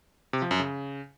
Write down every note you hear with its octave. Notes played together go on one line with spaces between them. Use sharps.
C3
F3
F#2
C#3